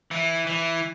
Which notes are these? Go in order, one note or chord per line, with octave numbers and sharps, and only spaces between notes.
E3
E3